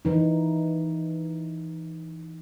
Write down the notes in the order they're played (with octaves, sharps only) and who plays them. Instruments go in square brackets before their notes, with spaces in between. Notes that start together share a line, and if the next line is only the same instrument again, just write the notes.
[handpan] E3 D#4